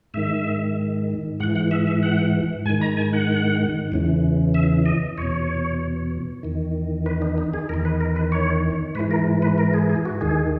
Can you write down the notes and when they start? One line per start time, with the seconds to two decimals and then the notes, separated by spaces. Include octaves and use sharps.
0.14 G#2 D#3 E5
1.40 G#2 F#5
1.44 E3
1.56 F#5
1.71 E5
1.87 E5
2.03 F#5
2.66 G#2 G#5
2.70 D#3
2.81 A#5
2.97 G#5
3.13 F#5
3.92 E2 C#3 E3
4.54 E5
4.86 D#5
5.18 E2 B2 C#5
6.43 E2 D#3
7.06 B4
7.22 D#4
7.38 D#4
7.54 G#4
7.69 E2 D#3 A#4
7.85 B4
8.01 A#4
8.16 B4
8.32 C#5
8.95 G#2 B4
8.99 E3
9.11 A#4
9.42 B4
9.58 A#4
9.74 G#4
9.89 G#4
10.05 F#4
10.21 D#2 D#3 G#4